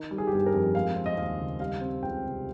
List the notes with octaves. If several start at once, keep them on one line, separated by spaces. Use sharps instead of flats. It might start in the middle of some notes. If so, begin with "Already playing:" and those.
Already playing: D#3
G3
G#4
G4
G1 G#4
A#4
F2
G#3 F5
C4
D#5
D#2 F5
C#3
G3 F5
C4
C#2 G5
C3